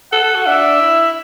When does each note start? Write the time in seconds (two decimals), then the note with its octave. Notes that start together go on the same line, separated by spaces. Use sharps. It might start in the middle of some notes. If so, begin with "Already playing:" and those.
0.12 A4 F#5
0.24 A4
0.35 F#4
0.46 D4 E5
0.81 E4